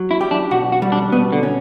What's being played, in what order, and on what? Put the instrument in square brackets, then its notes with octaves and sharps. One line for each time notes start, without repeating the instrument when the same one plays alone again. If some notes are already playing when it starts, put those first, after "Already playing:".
Already playing: [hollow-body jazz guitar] F#3
[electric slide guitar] E4
[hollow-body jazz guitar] G4
[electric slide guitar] D4
[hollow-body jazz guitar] B1 [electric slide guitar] F#4
[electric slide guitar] F#4
[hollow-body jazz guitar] G3
[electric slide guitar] D4
[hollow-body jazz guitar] B2 [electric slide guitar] B3
[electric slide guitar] D3
[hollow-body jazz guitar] C#4